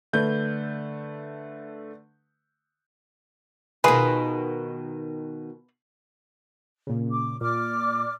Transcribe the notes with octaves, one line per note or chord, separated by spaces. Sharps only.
D3 A3 B4 G6
B2 D#3 F4 G#4 B4
A#2 C#3
D6
A#2 D5 D6 F6